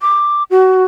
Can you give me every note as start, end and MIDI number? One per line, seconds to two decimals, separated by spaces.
0.01 0.43 86
0.50 0.85 66